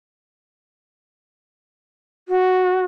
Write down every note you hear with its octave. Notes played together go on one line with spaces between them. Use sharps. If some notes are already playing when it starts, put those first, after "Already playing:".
F#4